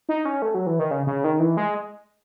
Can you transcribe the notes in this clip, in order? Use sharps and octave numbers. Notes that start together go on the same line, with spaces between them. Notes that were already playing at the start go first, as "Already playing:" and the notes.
D#4
C#4
A3
F#3
E3
D#3
C#3
C#3
D#3
E3
G#3